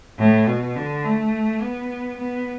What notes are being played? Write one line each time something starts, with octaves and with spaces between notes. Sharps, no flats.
A2
B2
D3
A3
B3
B3